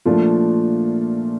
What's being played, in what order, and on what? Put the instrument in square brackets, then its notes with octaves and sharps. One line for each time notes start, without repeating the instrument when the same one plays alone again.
[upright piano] A#2 F3 A3 D4 F4